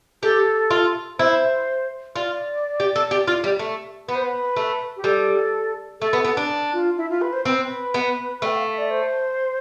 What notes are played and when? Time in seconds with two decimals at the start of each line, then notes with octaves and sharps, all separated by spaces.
0.23 G4 A4
0.70 F4
1.19 E4 C5
2.16 F4 D5
2.80 G4
2.96 A4
3.11 G4
3.27 F4
3.44 G3
3.59 A3
4.08 B3 B4
4.15 C5
4.23 B4
4.56 A3
4.97 G4
5.04 G3 A4
6.00 A3 A4
6.13 B3
6.24 B3
6.37 D4
6.73 F4
6.97 E4
7.10 F4
7.22 B4
7.33 C5
7.45 C4 B4
7.94 B3
8.42 A3 G5
8.56 F5
8.67 E5
8.78 D5
8.91 C5